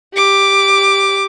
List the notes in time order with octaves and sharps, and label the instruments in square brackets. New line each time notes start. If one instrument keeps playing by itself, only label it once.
[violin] G4 D6